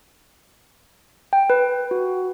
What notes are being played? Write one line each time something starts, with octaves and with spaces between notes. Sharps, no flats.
G5
B4
F#4